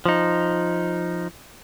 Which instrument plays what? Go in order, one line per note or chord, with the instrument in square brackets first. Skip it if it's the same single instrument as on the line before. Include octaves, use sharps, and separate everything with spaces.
[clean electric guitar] F3 D#4